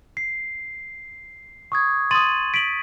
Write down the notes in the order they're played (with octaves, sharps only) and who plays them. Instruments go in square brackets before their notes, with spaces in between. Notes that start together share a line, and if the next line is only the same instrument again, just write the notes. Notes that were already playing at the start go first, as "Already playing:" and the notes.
[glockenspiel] C7
C#6 D#6 G#6
[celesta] C6 D#6 [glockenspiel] A6 D#7 F#7
[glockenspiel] B6 [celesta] D7 F#7